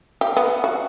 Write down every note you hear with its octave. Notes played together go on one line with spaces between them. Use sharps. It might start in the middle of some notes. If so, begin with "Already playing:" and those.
G4
B3
F#4